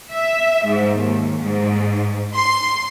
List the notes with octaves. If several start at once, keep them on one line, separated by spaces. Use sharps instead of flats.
E5
G#2
D#2
G#2
C6